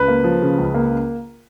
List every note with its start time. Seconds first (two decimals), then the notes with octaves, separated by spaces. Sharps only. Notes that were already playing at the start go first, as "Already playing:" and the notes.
Already playing: C#2 B4 B5
0.08 A#3
0.24 F3
0.42 C#3
0.58 C#2
0.74 A#3